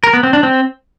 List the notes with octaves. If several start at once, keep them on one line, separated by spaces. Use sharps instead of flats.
A#4
B3
C4
D4
C4